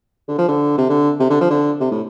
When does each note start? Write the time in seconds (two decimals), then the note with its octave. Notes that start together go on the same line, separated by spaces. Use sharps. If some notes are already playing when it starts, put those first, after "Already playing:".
0.28 D3
0.38 F3
0.48 D3
0.78 C3
0.89 D3
1.20 C3
1.30 D3
1.41 F3
1.50 D3
1.81 C3
1.91 A2